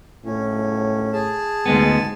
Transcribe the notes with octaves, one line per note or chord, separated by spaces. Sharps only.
A2 C#4
G#4 A5
D2 G#2 G#3 B3